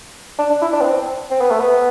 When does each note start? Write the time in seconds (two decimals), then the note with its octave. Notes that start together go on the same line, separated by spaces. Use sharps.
0.39 D4
0.50 D4
0.62 E4
0.73 D4
0.81 B3
0.85 C4
1.31 C4
1.41 B3
1.50 A3
1.60 B3